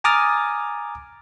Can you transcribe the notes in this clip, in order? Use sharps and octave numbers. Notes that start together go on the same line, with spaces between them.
G#5 A#5 D6 D#6 F6 A6